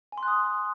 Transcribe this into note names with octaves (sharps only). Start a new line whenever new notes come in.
G#5
C6
F#6
D#6